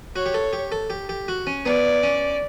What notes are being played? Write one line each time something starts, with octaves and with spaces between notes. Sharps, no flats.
F#4 C#5
G4
A4
G4
A4
G4
G4
F#4
C#4
B3 D5
C#4